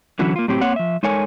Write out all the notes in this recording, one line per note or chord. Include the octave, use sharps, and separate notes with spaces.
D3 E3 F#3 C#4 E4 F#4
A#3 F4
A2 F#3 C4 G4
A#3 C4 C#5 F#5
F3 E5
G#3 D#4 A4 A#4 C#5 G#5